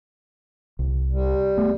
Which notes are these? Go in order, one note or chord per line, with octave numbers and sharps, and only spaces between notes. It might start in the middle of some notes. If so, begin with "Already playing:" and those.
C2
G3
A3 B3